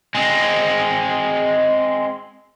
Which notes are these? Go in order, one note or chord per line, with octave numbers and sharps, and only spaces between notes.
G#3 C4